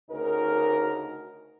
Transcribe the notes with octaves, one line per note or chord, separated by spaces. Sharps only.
D2 C#3 D#4 F#4 A#4